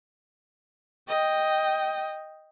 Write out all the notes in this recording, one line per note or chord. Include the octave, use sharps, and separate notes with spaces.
D#5 G5